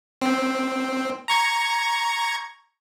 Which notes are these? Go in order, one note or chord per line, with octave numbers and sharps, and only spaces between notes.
C4
A#5 C#6 G#6